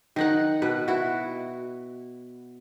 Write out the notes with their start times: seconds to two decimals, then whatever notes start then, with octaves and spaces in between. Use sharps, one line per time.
0.16 D#3 D#4 F#5
0.62 B2 B4
0.88 E4 F#4